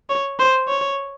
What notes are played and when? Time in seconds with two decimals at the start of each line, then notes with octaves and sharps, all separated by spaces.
0.10 C#5
0.39 C5
0.68 C#5